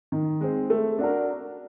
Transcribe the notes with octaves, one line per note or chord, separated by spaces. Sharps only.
D#3
G#3 C4
A3
D4 F#4 A#4